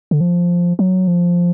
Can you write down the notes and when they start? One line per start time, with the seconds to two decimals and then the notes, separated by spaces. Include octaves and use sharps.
0.11 D3
0.21 F3
0.79 F#3
1.07 F3